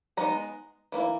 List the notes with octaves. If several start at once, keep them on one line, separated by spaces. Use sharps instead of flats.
E3 G#3 B3 D#4 A#5
E3 A#3 C#4 E4